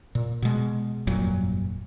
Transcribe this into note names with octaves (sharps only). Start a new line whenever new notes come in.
A#2
B2 G#3
G1 F2 A#2 F#3